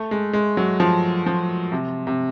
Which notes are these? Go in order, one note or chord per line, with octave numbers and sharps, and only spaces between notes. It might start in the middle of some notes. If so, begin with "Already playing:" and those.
Already playing: A3
G#3
G#3
F#3
F3
F3
C3
C3